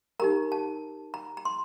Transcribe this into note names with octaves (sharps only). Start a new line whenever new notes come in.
D#4 G4 A#4 A#5
A5
A#5
A#5
C6